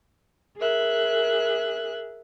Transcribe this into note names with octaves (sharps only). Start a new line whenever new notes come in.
G#4 A#4 E5 F#6